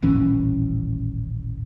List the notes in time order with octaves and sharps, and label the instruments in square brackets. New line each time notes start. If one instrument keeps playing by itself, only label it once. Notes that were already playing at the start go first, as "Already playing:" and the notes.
[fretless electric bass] D#1 A1 E3 C#4